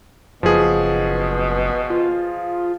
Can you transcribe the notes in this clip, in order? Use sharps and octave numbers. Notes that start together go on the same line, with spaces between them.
F#1 B2 F3 G#4
F4